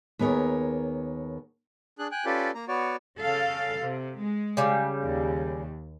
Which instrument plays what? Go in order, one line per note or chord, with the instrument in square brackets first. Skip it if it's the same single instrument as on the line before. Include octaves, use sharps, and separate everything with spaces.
[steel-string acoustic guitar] D#2 B3 G#4 A#4 C#5
[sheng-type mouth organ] D4 G#4 F#6
G5 G#5 F#6
C#4 F4 G4 A4 B4 D5
A#3 A#5
B3 F#4 C#5 D5
[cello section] C#3 A4 F5
C3
G#3
[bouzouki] C#3 G3
[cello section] D#2